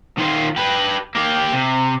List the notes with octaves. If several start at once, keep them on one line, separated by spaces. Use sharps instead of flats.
D#3 F4
G4 B4
A#3 G4
C3